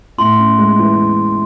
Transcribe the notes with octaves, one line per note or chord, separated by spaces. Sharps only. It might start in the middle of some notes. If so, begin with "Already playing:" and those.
A2 C6
C#4
G#3
E3